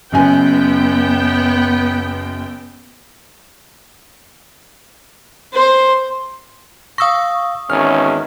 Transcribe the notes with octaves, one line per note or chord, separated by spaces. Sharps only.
F#1 F#2 B3 G5 G#5
C5
F5 C#6 D#6 E6 A#6
G#1 E2 D#3 C#4 F6